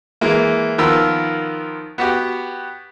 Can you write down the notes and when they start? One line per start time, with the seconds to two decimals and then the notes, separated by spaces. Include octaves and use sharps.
0.21 E3 G#3 A#3
0.78 D#3 F3 B3 F4 A#4 E6
1.98 B3 F#4 G4